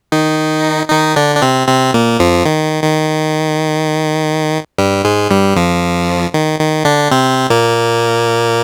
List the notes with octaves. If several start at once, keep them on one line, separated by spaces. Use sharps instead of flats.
D#3 D#4
D#3 D#4
D3 D4
D4
C3 C4
C3 C4
A#2 A#3
F2 F3
D#3
D#3
G2 G3
G#2 G#3
G2 G3
F2 F3
D#3
D#3
D3 D4
C3 C4
A#2 A#3